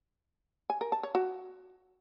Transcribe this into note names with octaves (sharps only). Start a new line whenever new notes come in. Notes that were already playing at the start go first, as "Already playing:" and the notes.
G#5
A#4
A5
C#5
F#4